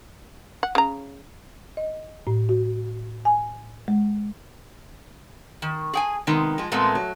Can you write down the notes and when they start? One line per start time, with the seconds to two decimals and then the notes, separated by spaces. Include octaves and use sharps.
0.63 F#5
0.75 C#3 A#5
1.77 D#5
2.27 A2
2.49 F#4
3.25 G#5
3.88 G#3
5.62 D#3
5.94 G#4 G5 G#5
6.27 C3 D#3 G#3 B3
6.58 F3 G#3
6.72 A#2 G#3 A3 B3 C4
6.95 F#3